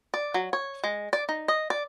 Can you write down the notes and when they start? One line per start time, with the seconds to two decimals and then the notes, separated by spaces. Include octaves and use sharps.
0.14 D5
0.34 F#3
0.53 C#5
0.84 G#3
1.13 D5
1.29 D#4
1.48 D#5
1.70 D5